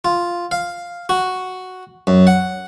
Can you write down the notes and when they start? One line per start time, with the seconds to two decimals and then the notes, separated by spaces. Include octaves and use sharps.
0.05 F4
0.51 F5
1.09 F#4
2.07 F#2
2.27 F#5